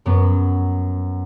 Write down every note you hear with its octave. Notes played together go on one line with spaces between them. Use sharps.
F#2 F#3 B3